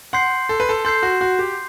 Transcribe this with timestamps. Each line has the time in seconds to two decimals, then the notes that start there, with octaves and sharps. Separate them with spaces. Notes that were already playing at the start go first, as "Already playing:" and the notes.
0.13 F#5 C6 G6 C7
0.49 A4
0.60 B4
0.69 A4
0.85 A4 C6 G6 C7
1.03 F#4
1.21 F#4
1.39 G4